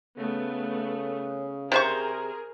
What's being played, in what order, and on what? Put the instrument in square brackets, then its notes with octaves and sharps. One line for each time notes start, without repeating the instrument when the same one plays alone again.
[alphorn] C#3 [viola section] A3 B3
[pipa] C3 C5 C#6 [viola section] G#4 A#4